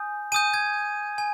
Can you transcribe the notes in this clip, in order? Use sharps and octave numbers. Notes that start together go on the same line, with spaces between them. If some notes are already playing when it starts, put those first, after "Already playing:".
Already playing: G#5 D#6 G6
G#5 D#6 G6 D#7
G#6
G#5